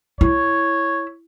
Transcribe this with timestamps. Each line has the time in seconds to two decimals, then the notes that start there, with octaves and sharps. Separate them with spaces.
0.21 E4 C#5